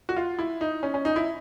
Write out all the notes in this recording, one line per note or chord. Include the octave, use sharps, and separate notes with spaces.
F#4
F4
E4
D#4
C#4
C#4
D#4
E4